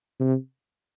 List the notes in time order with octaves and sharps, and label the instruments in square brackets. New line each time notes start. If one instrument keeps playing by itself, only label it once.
[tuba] C3